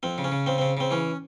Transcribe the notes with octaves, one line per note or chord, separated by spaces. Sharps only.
F2 C4
C#3
C#4
C#3
C#3 C4
C#3 C4
C#3 C4
E3 C#4